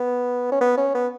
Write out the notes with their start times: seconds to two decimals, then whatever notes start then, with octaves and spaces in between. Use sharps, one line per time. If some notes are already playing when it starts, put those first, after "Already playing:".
Already playing: B3
0.52 C#4
0.61 B3
0.77 C#4
0.95 B3